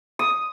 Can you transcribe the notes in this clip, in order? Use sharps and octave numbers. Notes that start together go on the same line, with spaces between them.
D#6